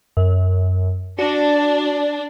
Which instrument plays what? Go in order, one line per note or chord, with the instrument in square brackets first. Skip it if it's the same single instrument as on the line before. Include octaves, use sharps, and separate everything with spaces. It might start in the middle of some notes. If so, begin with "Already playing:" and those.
[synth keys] F#2
[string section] D4 [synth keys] F#4